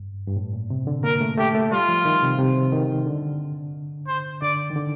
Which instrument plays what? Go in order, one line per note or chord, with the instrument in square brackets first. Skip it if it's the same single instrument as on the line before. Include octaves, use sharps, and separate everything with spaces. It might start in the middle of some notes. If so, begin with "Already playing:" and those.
Already playing: [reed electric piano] G2
G2
A2
A#2
C3
D3
[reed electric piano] A#3 [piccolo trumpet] A#4
[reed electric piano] A3
[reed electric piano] A3 [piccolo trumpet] G4
[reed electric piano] A3
[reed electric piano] G3 [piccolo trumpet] F4
[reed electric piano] F3
D#3
C3
C3
D#3
D3
[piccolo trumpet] C5
[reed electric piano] D3 [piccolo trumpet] D5
[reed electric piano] D#3
D3